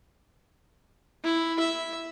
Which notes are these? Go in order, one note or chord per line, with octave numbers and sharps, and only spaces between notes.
E4
E5